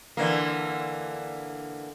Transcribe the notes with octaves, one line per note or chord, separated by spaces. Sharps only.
D3 E3 A#3